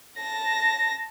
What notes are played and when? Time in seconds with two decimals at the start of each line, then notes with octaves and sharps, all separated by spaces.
0.17 A5 A#6